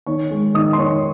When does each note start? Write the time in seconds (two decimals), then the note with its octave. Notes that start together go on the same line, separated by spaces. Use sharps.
0.06 D#3 C#5 C#6
0.31 G#3
0.54 D#3 D#5 D#6
0.73 C6
0.79 D#3 C#5 C#6